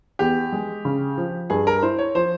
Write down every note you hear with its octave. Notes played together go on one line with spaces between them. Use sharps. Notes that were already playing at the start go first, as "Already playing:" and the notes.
E2 G4
G#3
C#3
F3
G2 G#4
A#4
E4 C5
C#5
F3 C5